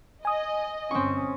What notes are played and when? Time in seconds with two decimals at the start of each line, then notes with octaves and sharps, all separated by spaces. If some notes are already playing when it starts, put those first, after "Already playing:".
0.25 D#5 G#5 D#6
0.91 G1 C4 C#4 C#6